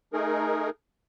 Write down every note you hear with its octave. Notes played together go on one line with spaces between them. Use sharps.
A3 D#4 G#4 A#4